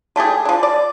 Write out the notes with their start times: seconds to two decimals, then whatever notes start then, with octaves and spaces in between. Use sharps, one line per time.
0.16 D3 A3 G4 G#4
0.45 F3 D4
0.63 D5